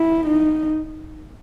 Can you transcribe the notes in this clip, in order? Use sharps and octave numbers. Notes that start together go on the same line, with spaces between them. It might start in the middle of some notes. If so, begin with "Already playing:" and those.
Already playing: E4
D#4